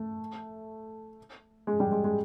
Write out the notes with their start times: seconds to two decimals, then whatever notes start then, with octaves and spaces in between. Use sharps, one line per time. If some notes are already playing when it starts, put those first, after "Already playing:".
Already playing: A3
1.67 G#3
1.80 G3
1.92 G#3
2.04 G#3